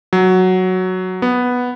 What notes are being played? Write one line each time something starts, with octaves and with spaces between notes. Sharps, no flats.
F#3
B3